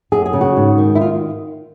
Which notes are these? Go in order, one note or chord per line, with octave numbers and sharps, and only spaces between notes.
F#2 G#4
G#4
C#3
F#4
G#2
D#3
E4
F4